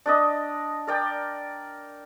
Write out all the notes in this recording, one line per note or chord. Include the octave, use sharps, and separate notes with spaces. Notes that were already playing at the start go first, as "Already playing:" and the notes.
D4 D5 D#5
A#4 D5 G5